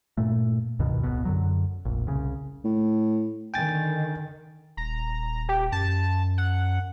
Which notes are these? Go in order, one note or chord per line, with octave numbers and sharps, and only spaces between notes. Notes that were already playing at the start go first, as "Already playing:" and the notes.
G2 A#2 A3
C#2 G2 B2 D#3
D1 B1 B2
F#2 D3 F#3
F1 A#1
C2 C#3
A2
D3 D#3 G5 G#5 A6
D#1 A#5
G4
F#2 A5
F#5